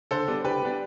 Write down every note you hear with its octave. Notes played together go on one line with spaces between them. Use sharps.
D3 A4 C5
G3 B3 D4
D3 G4 B4
G3 B3 D4